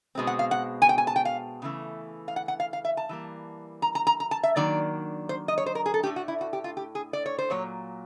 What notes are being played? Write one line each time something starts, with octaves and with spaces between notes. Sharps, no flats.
B2 G#3 C4
F#5
F5
F#5
G#5
G5
G#5
A5
G5
F5
C#3 E3 A3
F5
F#5
F#5
F5
F5
E5
A5
E3 G3 A#3
A#5
A#5
A#5
A#5
A5
E5
D#3 F#3 A#3 D4 D5
C5
D#5
C#5
C5
A#4
G#4
A4
A2 F3 A3 D4 G4
F#4
E4
F#4
G4
F4
G4
G#4
D5
C#5
C5
A#2 F#3 A#3 C#5